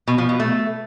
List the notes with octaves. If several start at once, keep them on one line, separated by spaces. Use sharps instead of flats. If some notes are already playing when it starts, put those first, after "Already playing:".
B2
F3
B2
A3